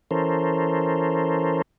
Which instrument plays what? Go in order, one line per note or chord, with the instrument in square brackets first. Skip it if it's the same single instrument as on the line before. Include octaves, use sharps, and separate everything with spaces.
[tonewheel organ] E3 C#4 A4 A#4 C5